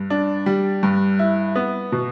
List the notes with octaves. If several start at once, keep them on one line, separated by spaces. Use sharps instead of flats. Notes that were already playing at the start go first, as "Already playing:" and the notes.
Already playing: G2
D4
G3
G2
E4
B3
B2